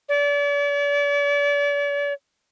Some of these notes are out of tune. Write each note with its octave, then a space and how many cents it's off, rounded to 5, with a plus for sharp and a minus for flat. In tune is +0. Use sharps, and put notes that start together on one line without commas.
D5 -40